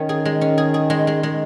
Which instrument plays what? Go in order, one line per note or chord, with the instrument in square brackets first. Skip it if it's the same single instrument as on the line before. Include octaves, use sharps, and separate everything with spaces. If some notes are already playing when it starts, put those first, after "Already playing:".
Already playing: [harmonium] D#3 [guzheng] C#4
[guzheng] G#4
G#3
C#4
G#4
G#4
G#3
G#3
G#3